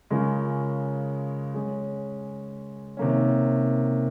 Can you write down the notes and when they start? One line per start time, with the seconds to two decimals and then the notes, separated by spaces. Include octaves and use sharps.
0.10 C#3 G#3 C#4 F4 A#4
1.54 G#3 C#4 G#4
2.97 C3 D#3 A#3 C#4